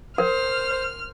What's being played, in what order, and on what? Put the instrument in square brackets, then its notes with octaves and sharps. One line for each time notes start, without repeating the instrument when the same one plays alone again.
[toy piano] A#4 [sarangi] C5 [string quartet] F6